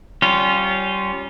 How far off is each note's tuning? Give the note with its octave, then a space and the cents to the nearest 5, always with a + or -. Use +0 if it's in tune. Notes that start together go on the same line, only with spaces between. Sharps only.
G3 -25 C#4 +0 F4 -15